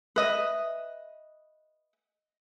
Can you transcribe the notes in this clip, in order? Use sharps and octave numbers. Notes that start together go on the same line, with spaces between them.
B4 D#5 E5